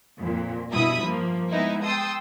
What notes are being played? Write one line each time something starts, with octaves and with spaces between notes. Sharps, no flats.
F2 A#2
G2 B2 E4 E5 B5 D#6
F3 A#3
G#3 B3 D#4 E4
G5 A5 C6 D#6 E6